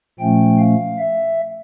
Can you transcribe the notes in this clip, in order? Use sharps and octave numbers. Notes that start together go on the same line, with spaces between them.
A#2 F3 A3 C#4 G5
F5
E5